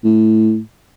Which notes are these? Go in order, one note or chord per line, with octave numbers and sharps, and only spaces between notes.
A2